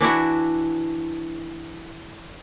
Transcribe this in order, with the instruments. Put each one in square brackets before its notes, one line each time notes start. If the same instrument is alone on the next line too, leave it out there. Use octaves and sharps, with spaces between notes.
[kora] E3 D4 E4 F#4